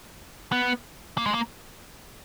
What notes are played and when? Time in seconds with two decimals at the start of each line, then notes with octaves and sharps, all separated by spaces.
0.52 B3
1.18 A#3
1.26 G#3
1.34 A#3